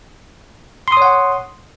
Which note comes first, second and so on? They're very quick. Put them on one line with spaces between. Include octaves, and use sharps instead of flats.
C6 D#6 C#5 F#5